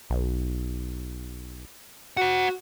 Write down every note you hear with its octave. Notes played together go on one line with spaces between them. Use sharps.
B1
F#4 C5 F#5